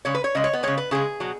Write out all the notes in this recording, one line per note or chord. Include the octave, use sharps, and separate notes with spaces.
C#3 G#3 C#5
B4
C#5
C#3 G#3 D#5
C#5
B3
C#3 G#3 C#5
B4
C#3 G#3 G#4
B2 F#3